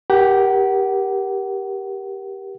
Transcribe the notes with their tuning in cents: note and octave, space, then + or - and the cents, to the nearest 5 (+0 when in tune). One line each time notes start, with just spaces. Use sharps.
G4 +0 A#4 +20 F#5 +30